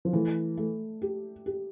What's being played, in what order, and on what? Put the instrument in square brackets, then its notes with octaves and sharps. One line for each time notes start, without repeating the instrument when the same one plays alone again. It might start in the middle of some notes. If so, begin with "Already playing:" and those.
[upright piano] F3
[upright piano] E3 [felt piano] A3
[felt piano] A3
G4
G4